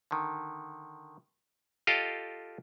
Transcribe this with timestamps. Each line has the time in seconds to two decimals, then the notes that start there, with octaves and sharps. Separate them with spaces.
0.11 D3 D#3
1.87 F4 G4 A4 D#5 F5 G5